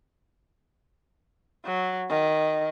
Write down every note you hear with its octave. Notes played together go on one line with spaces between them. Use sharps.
F#3
D#3